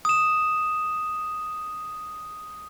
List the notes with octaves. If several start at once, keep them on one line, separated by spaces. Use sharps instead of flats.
D#6 E7